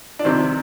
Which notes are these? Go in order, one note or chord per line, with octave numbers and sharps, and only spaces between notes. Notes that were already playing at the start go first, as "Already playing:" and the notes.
D4
C2 C3 D#3 C4